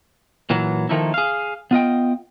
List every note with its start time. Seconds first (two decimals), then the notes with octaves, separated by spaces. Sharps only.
0.50 A#2 E3 F#3
0.89 D#3 F3 A3 A#3 D#4 E4
1.14 G#4 F5
1.71 B3 F4 D#5 G5